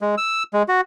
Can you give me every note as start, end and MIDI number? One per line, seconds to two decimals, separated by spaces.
0.01 0.15 56
0.18 0.43 88
0.54 0.63 56
0.68 0.81 66